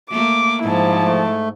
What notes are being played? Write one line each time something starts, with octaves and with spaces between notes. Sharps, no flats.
A3 A#3 D6
G#2 F3 E4 A5
A3